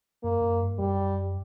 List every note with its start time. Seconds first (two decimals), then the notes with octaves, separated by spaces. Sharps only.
0.23 F#2 A#3
0.42 F#2
0.61 G2
0.79 F#2 G3